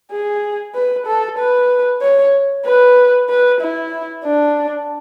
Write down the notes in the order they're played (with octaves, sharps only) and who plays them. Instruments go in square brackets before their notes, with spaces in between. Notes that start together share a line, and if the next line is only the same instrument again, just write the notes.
[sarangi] G#4
B4
A4
B4
C#5
B4
B4
E4
D4